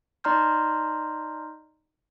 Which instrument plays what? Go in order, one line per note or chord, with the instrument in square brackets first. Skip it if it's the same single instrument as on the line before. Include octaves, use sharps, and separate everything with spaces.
[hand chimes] D#4 D5 A#5 C6 F6 G6